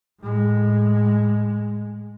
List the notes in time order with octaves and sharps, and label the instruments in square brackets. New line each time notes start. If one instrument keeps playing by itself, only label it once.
[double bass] A2 G#3